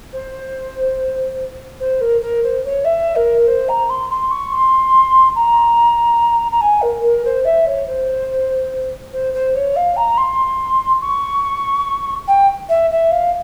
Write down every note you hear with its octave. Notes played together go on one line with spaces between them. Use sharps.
C5
C5
A#4
A#4
C5
C#5
E5
A#4
C5
A#5
C6
C6
C#6
C6
A#5
A#5
G#5
A#4
A#4
C5
E5
C#5
C5
C5
C5
C#5
F5
A#5
C6
C#6
G5
E5
E5
F5